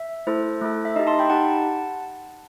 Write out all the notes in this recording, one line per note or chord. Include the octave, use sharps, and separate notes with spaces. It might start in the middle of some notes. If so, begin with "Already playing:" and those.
Already playing: E5
A3 E4 A4 C5
A3 E4 A4
E5
D#4 G4 D#5
A5 C6
G5 B5
D#4 G4 F#5 A5